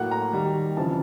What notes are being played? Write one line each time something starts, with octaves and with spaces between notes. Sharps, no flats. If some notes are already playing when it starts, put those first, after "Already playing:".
Already playing: A2 F#3 A#3 F#5
A#5
D#2 D#3 G3
F2 C#3 E3 A5